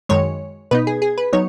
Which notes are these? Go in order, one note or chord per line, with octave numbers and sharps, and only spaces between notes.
F#2 D#3 G#3 C#5
B2 B3 D#4 B4
G#4
G#4
B4
F#3 B3 D#4 C#5